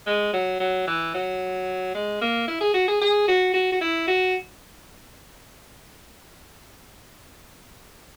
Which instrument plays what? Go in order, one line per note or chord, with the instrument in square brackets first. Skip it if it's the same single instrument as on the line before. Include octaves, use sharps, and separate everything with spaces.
[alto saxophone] G#3
F#3
F#3
E3
F#3
G#3
A#3
E4
G#4
F#4
G#4
G#4
F#4
F#4
F#4
E4
F#4